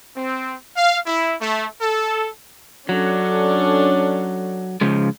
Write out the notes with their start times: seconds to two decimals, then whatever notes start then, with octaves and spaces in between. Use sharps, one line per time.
0.16 C4
0.76 F5
1.06 E4
1.40 A3
1.81 A4
2.89 F#3 C#4 D4 A4
4.81 C#3 F3 G#3